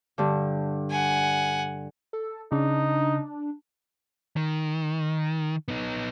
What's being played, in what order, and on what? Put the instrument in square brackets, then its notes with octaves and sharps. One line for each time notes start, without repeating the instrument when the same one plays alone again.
[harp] G2 D3
[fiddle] F#5 G#5
[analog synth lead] A4
[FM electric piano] C#3 [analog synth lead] D4 [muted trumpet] D#4
[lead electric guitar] D#3
B3 D#4